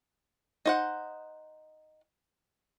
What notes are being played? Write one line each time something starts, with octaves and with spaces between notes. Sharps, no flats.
D#4 C5 F#5